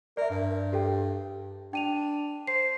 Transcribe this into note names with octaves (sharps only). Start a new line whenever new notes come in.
A#4 D5 E5
G2
G4 A4 G5
D4 G5 D#7 F7
C5 C7